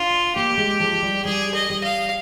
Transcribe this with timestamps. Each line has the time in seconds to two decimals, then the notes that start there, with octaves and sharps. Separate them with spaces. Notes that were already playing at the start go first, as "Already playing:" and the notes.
Already playing: D4 F4
0.35 A#3 G4
0.57 G#3
0.80 F3
1.03 G3
1.25 G3 G#4
1.54 D#5
1.70 G3
1.84 F5